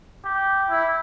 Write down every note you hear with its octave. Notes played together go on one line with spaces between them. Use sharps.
G4
E4